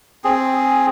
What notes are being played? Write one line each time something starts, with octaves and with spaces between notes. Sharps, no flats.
C4 G#4